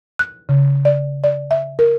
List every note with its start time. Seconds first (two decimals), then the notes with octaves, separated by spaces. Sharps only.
0.19 F#6
0.49 C#3
0.85 D5
1.24 D5
1.51 E5
1.79 A#4